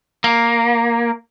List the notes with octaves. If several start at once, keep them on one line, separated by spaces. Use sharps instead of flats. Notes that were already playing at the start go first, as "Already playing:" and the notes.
A#3